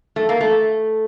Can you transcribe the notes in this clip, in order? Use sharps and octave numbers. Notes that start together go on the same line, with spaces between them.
A3
A#3
A3